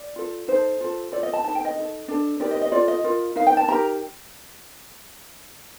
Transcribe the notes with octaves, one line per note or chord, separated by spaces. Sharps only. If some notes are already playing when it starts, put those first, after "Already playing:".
Already playing: D5
F4 A4
D#4 A4 C5
F4 A4
F4 A4 D5
D#5
A5
D#4 A4 A5
G5
D#5
D#4 A4
D4 A4
D#4 G4 A#4 D5
D#5
D#5
F4 A4 D5
D#5
F4 A#4
D#4 A#4 F5
G5
A5
D#4 G4 A#4 A#5